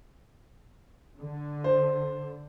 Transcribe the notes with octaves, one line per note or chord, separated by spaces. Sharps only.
D3
C5